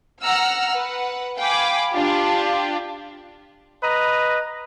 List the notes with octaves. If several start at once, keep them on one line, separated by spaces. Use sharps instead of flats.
F#5 A#5 E6 F6
B4 F#5
F5 G5 G#5 B5 D6
D4 F4 G4
B4 D#5 A#5